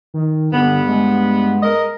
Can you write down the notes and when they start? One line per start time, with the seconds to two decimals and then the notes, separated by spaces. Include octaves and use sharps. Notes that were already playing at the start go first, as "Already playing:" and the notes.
0.14 D#3
0.53 G2 D3 B3
0.88 G#3
1.63 A#4 D#5